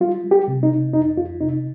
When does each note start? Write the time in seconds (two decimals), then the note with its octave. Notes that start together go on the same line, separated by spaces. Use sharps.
0.01 G3 F4
0.24 G3
0.31 G4
0.48 C3
0.63 D#4
0.71 C3
0.93 F2 D#4
1.17 F2 F4
1.41 C3 D#4